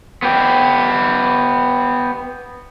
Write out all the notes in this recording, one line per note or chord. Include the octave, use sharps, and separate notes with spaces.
B3 G4